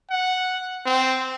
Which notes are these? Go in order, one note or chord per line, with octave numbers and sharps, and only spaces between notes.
F#5
C4